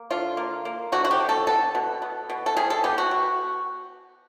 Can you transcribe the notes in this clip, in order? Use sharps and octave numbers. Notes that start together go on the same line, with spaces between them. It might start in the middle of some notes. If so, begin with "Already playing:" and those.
Already playing: A#3
D3 F4
A#3
A#3
D3 F#4
F#4
G4
D3
A4
B3 A4
B2
B3
B2
A4
G3 G#4
A4
B3 G4
F#4
B2